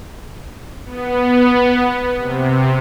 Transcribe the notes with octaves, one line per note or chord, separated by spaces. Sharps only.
B3
C3